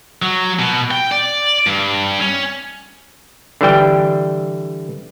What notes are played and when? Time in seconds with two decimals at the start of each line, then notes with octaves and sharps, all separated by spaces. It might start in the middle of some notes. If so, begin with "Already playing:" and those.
0.22 F#3
0.59 B2
0.91 G5
1.12 D5
1.67 G2
2.20 C#4
3.61 D3 E3 G3 G5